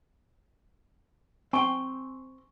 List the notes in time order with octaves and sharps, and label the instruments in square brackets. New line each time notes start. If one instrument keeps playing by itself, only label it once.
[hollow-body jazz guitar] C4 G5 [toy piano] G#5 C#6